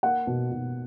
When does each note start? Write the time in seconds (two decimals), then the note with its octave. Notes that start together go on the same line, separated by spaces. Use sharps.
0.03 A#3 F#5
0.27 B2
0.51 B2